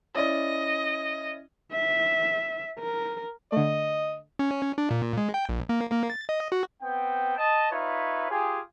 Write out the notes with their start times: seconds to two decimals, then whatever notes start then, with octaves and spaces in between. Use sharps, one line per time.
0.15 C#4 E4 D5 D#5
1.72 E5
2.79 A#4
3.52 D3 A3 D#5
4.39 C#4
4.78 D4
4.91 A#2
5.17 G#3
5.34 G5
5.49 A#1
5.69 A#3
5.92 A#3
6.10 A6
6.29 D#5
6.52 F#4
6.82 B3 C4 G5
7.37 D#5 A5
7.72 D#4 F4 B4 C#5 E5
8.30 F4 G4 G#4